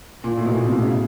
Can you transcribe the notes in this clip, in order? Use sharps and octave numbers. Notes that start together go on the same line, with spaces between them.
A#2
A2
B2
A#2
B2
C3
C#3